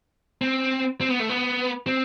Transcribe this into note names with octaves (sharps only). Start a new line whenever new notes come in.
C4
C4
B3
A3
B3
C4